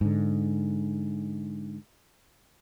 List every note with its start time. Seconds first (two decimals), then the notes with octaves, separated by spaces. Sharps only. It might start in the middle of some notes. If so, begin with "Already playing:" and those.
0.01 G#2 D3